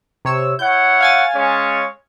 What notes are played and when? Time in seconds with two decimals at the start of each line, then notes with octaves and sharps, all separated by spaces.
0.25 C3 C#5 E6
0.59 E4 C#5 F#5 G6
1.00 F5 G#5 A6
1.34 G#3 C#4 C#5